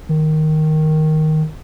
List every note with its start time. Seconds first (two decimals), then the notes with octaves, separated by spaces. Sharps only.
0.09 D#3